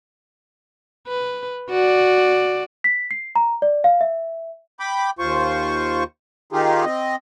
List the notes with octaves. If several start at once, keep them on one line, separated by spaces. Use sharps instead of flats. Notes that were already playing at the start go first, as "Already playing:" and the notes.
B4
F#4 D5
B6
C7
A#5
D5
F5
E5
G5 B5 D6
D#2 F4 C5 C#6
D#3 D#4 F4 G4 G#4
C4 D#5